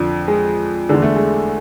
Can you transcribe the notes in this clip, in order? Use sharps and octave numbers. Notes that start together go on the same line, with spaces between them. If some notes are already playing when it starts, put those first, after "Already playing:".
Already playing: F2 D3
G#3
E2 D3 G#3
A3
G#3